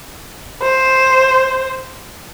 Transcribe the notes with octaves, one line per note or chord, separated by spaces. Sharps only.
C5